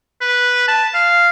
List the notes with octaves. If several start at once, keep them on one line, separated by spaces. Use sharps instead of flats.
B4
A5
F5